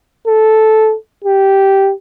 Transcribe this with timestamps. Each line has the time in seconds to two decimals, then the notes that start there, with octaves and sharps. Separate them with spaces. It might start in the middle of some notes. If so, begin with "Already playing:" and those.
0.27 A4
1.24 G4